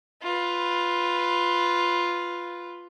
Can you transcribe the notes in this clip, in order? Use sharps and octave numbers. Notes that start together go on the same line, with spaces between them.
F4 B4